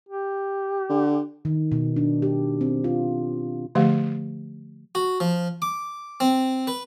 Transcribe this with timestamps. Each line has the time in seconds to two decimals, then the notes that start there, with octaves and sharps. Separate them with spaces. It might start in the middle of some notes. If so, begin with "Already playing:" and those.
0.09 G4
0.89 D3
1.45 D#3
1.72 B2
1.96 D4
2.22 G4
2.61 C4
2.84 F4
3.75 D3 F3 A3 G4 F5
4.95 F#4
5.20 F3
5.62 D6
6.20 C4
6.67 B4